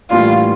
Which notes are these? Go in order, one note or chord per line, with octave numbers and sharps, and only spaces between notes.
A2 E3 G3 A#3 D4 F4